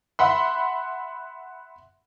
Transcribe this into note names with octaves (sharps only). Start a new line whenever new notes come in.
E5 F#5 B5 C6